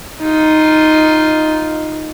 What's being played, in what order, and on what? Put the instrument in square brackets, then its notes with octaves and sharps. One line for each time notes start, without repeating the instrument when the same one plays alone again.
[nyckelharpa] D#4 F4